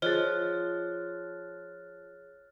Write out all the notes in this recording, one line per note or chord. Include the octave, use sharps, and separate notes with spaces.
F3 G#4 C5 C#5 D#5 F6 F#6 A6